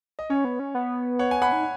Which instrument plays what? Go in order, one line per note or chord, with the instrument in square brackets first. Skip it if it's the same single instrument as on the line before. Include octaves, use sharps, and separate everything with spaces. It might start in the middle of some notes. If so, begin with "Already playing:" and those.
[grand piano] D#5
[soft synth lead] C#4 [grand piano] C#5
[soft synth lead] B3
C#4
B3
[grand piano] C#5 F#5
G#5
F#5 B5
[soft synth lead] D#4